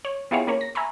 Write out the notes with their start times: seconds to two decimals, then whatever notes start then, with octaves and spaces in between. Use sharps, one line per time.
0.05 C#5
0.31 B3 E4 F4 G4 G#4 C#5
0.47 A#3 C#4 A#4 C#5
0.61 A#6
0.75 E5 G#5 A#5 B5 C#6